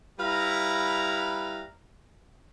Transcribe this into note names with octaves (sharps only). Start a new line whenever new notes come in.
G3 E4 B4 F5 A#5